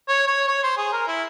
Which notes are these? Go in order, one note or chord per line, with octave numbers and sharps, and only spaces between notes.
C#5
C#5
C#5
C5
G#4
A#4
E4